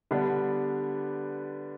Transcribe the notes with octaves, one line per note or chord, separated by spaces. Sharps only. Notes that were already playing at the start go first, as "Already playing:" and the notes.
D3 G3 B3 D4